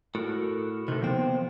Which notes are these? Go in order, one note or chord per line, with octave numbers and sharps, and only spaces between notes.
A2 F#4 A4 A#4
C3 D#3 A4
D#2 F3 B3 C4